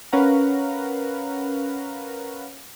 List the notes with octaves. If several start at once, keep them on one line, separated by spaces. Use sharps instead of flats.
C#4 A#4 B4 F5 F#5 A#5